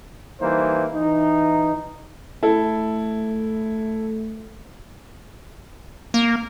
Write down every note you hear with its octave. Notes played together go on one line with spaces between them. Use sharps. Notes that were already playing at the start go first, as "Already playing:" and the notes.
E3 G3 A#3 D#4 C5
E3 D#4
A3 E4 A4
A#3